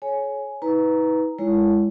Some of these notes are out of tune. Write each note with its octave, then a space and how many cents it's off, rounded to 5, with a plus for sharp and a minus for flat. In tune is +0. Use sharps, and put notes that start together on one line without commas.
G#4 +45 C#5 +0 G#5 +10
D#4 +40 B4 +0 A#5 +0
G#3 -20 E4 +30 C#5 +25